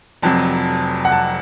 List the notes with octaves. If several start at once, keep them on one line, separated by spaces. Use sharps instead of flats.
F1 F2 C3 F#3 A5
F#5
A5